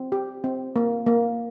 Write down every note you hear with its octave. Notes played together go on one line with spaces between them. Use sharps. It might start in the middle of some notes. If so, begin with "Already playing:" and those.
Already playing: C4
G4
C4
A#3
A#3